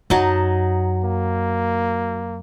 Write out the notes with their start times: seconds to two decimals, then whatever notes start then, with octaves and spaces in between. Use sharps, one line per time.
0.10 F#2 F#3 D#4 A5
1.04 A#3